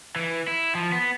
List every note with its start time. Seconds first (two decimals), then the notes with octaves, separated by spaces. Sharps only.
0.16 E3
0.48 E4
0.75 F3
0.92 B3